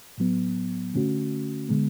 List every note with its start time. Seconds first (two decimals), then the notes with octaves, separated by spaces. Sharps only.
0.18 A2 F#3 B3
0.94 D3 A3 C#4 F#4
1.69 D3 G#3 B3